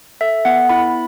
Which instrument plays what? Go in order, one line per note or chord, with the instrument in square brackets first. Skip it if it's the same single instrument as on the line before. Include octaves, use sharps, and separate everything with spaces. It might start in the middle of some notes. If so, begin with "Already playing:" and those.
[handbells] A4 E5
B3 F#5
E4 B5